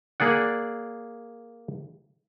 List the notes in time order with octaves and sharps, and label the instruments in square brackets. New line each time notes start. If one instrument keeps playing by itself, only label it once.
[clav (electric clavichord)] A#3 G#4 D5 F#5